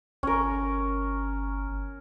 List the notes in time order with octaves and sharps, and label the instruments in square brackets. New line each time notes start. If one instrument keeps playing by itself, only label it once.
[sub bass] G1 [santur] C#4 A#4